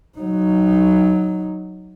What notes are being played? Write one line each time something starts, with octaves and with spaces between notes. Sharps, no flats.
F#3 D#4